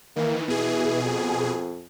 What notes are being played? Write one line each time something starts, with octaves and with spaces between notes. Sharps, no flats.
D#3 E3 A#3
B2 E3 G#4
F2